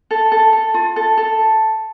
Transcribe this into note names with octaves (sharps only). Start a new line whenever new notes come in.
A4
A4
A4
F4
A4
A4